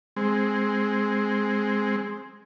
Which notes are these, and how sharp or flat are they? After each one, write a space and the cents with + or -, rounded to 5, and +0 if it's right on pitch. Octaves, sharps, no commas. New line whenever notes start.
G#3 +0 C4 +0